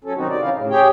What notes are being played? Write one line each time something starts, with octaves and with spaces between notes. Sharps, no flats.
F#3 C#4 A4
C3 D#3 F#3 C4 D#4 F#4
D5
E3 C#4 D#4 E4 F5
A2 C#3
G4 G#4 C#5 G5